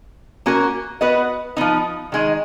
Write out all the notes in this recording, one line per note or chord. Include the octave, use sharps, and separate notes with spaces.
A#3 C#4 F#4 A#4
B3 F#4 B4 D#5
F3 B3 D#4
D#3 G#3 D#4